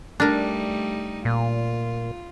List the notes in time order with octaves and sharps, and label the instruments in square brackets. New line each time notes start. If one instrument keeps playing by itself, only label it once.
[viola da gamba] G3 A3 D#4 [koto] D4 A#4
[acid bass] A#2 [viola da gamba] F4